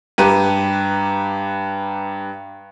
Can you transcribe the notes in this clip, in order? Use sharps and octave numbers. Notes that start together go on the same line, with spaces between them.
G2 G4 B4 A#5 D#7